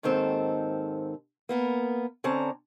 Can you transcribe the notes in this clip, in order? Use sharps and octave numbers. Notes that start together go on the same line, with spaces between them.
D#2 G#2 D#3 C4 A4
A#3 B3 A#4
D3 C4 C#4 A5 A#5